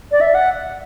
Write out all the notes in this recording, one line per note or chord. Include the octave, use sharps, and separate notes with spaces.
D5
E5
F#5